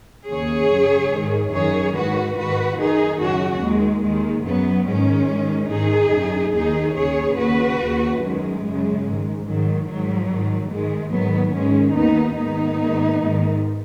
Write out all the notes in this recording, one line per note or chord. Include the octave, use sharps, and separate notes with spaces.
D#2 C#3 G#4 C#5
F#2 C#3
G#2 D#3
F#2 D#3 G#4 C#5
G#2 D#3 F#4 B4
G#2 D#3 F#4 B4
F#2 D#3 D#4 G#4
F#2 C#3 C#4 F#4
D#2 D#3 G#3
D#2 D#3 G#3
F#2 C#3 F#3 B3
G#2 D#3 G#3 C#4
G#2 D#3
G#2 D#3 D#4 G#4
F#2 C#3
D#2 D#3 D#4 G#4
D#2 C#3 G#4 C#5
D#2 C#3 F#4 B4
D#2 C#3
F#2 D#3 G#3
F#2 C#3
G#2 D#3
G#2 D#3 F#3
G#2 D#3 F#3
G#2 D#3
G#2 D#3 G#3
G#2 D#3 F#3 B3
G#2 D#3 G#3 C#4
D#2 D#3 B3 D#4
G#2 D#3 B3 D#4
G#2 D#3
G#2 D#3